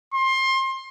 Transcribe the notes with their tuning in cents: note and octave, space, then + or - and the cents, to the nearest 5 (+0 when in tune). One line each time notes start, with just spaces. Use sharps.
C6 +25